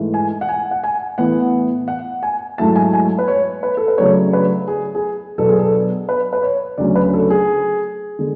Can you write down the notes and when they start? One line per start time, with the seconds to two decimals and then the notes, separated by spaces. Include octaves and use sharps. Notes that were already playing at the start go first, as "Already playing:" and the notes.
Already playing: G#2 E3 A3
0.14 G#5
0.41 F#5
0.48 G#5
0.71 F#5
0.84 G#5
1.18 A2 E3 B3 F#5
1.88 F#5
2.23 G#5
2.58 G#2 F#3 A3 E4 A5
2.76 G#5
2.93 G#5
3.19 B4
3.28 C#5
3.63 B4
3.77 A4
3.88 B4
3.98 C#3 F#3 A3 D4 C#5
4.33 B4
4.68 G#4
4.95 G#4
5.38 B2 F#3 B3 D4 A4
5.49 G#4
5.59 A4
6.09 B4
6.33 B4
6.43 C#5
6.78 D2 C#3 F#3 C#4 D5
6.95 B4
7.14 A4
7.30 G#4
8.19 D3 G#3